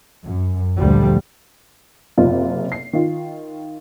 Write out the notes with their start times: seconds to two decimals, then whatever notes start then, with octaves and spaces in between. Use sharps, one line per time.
0.25 F#2
0.77 D2 A#2 D3 F3 G3
2.18 F#1 C3 F4
2.72 C7
2.93 D#3 F4